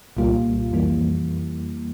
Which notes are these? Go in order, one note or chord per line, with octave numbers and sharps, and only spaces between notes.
C2 A#2 G3 A#3 F4
F2 E3 G3 A#3